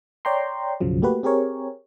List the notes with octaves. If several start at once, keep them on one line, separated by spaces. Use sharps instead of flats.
C#5 D5 G5 A#5 C6
B1 F#2 C#3 F3 F#3
A3 A#3 F#4 G4 B4
C4 G4 G#4 A#4 C#5